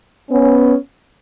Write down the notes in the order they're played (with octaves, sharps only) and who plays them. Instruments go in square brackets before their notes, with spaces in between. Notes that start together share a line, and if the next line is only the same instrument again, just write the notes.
[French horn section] B3 C#4